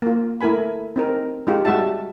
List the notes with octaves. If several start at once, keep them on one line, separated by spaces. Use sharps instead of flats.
A#3 F4
A3 E4 A#4 G#5 B5
C4 D#4 A#4
G#3 D#4 F4 G4
G3 G#3 F#4 E5 A5